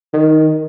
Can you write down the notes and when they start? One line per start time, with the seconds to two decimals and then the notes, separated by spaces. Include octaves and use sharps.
0.13 D#3